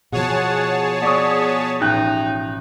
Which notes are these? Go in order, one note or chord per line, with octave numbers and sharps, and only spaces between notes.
B2 F3 G#4 C#5 F#5 A5
B3 D5 C#6 D#6
A1 D#4 G5 F#6